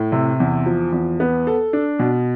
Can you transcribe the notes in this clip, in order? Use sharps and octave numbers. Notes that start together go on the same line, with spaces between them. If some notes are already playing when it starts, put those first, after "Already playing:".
Already playing: A2
C3
E2
F3
E2
B3
A4
D4
B2